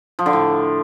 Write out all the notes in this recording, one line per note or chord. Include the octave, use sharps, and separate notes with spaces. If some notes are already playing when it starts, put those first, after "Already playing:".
F3
D3
A2